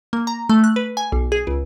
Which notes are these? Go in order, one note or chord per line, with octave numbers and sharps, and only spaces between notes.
A#3
A#5
A3
F#6
B4
G#5
B1
G#4
C#2